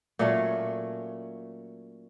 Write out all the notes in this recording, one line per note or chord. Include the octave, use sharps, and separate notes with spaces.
A#2 F#3 A3 C#4